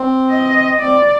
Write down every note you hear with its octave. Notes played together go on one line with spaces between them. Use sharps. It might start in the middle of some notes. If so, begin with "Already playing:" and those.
Already playing: C4
D#5
C4 D5